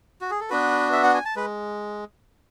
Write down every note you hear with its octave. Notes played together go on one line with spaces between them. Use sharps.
F#4
G#4
A4
B3 D4 F#4 B4
E5
F#5
G#5
A5
G#3 B4